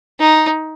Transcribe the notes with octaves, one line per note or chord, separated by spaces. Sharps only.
D#4